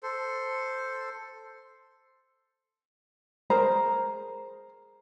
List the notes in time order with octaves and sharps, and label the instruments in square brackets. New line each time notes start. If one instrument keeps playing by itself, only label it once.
[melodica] A4 C5
[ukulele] G#4 A#4 C5 A#5